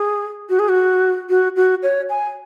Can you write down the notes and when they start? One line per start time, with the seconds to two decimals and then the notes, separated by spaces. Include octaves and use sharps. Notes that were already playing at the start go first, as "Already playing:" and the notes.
Already playing: G#4
0.49 F#4
0.59 G#4
0.69 F#4
1.30 F#4
1.56 F#4
1.83 C#5
2.09 G#5